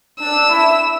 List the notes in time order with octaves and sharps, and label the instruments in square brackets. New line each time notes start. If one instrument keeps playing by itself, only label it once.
[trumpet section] D4 [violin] E6
[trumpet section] E4